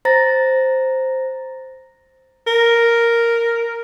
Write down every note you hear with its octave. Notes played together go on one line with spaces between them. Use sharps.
C5 A#5 A6 A#6
A#4